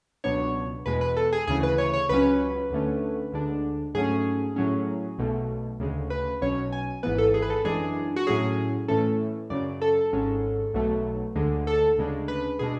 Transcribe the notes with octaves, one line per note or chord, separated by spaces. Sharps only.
C#2 B2 F#3 B3 D4 C#5
E2 B2 G#3 B4
B4
A4
G#4
D2 C#3 E3 G#4
B4
C#5
C#5
C#2 C#3 F#3 C#4 B4
D2 D3 A3 C#4
D2 D3 G#3 D4
G#2 F#3 A3 C#4 G#4
A2 F#3 C#4
B1 B2 A3
D2 C#3 G#3
B4
B1 B2 F#3 C#4 C#5
G#5
G#1 G#2 E3 B3 B4
A4
G#4
B4
A4
F#2 E3 G#3 D4 G#4
F#4
A2 F#3 C#4 G#4
A2 E3 A3 C#4 A4
F#2 C#3 F#3 D5
A4
G#1 G#2 G#3 C#4
B1 B2 F#3 A3
D2 D3 G#3
A4
D2 C#3 G#3 D4
B4
B2 G#3 D4 G#4